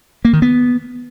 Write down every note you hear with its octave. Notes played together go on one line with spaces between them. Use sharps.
A#3
D#3
B3